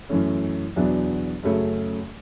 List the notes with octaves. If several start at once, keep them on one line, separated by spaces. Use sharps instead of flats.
F#2 E3 A3 C#4
E2 B2 F#3 B3 D4
F#2 C#3 F#3 A3 C#4